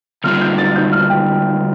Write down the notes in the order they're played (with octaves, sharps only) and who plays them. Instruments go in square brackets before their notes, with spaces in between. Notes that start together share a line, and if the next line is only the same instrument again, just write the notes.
[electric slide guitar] D3 G3 C4 F4 [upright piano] F6
[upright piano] G6
A6
G6
F6
G5